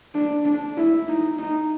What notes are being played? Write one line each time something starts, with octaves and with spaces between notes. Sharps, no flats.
D4
D4
E4
D#4
D#4